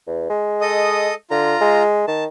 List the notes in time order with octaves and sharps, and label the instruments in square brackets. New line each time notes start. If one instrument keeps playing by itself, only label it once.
[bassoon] E2
G#3
[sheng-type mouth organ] A4 D#5 D#6
[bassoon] D3 [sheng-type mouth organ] F4 A#5
[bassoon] G#3
[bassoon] D#3 [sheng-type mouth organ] A5